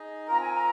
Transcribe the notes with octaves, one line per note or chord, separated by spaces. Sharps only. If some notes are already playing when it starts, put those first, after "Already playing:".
Already playing: D#4 G#4 D#5
C4 F4 A#4 A#5
G#5
A#5